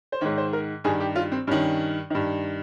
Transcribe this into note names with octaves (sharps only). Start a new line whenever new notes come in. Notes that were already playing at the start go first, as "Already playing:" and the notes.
C5
G#2 D#3 C#5
C5
A#4
G2 D#3 G#4
G4
F4
C4
G2 D#3 C#4
G2 D#3